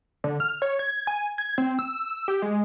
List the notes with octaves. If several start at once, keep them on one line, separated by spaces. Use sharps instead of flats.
D3
F6
C#5
G#6
G#5
G#6
C4
E6
G4
G#3